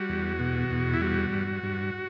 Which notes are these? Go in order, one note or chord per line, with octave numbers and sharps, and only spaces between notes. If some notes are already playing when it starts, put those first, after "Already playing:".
Already playing: G3 F#4
E2
B2
E2
E4
G3 F#4
G2
G2